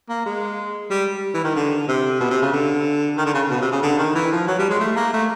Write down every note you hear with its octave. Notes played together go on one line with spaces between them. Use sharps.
A#3
G#3
G3
E3
D#3
D3
C3
B2
C3
C#3
D3
D#3
D3
C#3
B2
C3
C#3
D3
D#3
E3
F3
F#3
G3
G#3
A3
A#3
A3